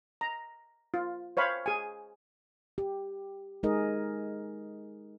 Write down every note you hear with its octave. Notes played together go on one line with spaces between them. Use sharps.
A#5
F4
C5 C#5 F5 B5
G#4 G#5
G4
G#3 D#4 G#4 A#4 D#5